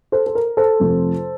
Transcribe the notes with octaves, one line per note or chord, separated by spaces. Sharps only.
A4 C5
A4
A#4
A4 C5
F2 C3 F3 A3